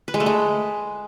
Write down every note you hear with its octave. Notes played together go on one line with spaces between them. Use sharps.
B4
G#3
A3
G#3